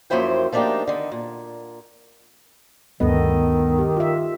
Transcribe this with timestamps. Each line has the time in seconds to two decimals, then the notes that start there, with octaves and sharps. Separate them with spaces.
0.10 F#2 F3 A#3 E4 C5 G5
0.52 F3 A3 A#3 D4 D#4 G4
0.87 D3 D#3
1.11 A#2
3.00 D2 G2 D#3 B3 A4 D#5
3.79 G4
3.97 F4 E5